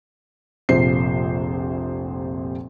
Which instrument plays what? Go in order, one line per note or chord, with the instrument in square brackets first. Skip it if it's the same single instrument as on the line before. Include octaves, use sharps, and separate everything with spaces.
[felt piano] F1 A#1 C3 F3 C5 C7